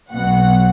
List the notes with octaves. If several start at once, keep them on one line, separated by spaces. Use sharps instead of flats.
B1 B2 F#3 F#5